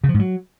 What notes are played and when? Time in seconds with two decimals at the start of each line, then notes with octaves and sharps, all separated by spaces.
0.04 C#3
0.09 F3
0.14 G#2
0.19 F#3